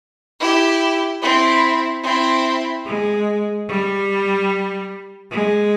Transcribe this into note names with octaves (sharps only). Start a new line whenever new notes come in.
E4 G4
C4 E4
C4 E4
G#3
G3
G#3